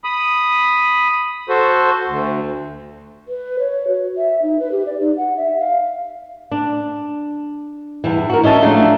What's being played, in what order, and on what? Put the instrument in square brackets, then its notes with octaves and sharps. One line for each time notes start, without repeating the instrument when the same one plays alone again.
[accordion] B5 D#6
F#4 A4 C5
D2
[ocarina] B4
C#5
F#4
E5
D#4
B4
G4
D5
D#4
F#5
E5
F5
[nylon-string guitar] D4
E2 G2 E3
F#4 A#4
C#4 D#5 E5 A5
F3 F#3 G#3 A3 D4